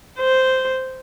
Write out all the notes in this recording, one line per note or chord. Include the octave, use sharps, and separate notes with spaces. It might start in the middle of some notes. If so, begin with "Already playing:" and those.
C5